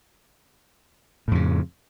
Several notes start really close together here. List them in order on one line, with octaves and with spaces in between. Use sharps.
A2 F2 C#3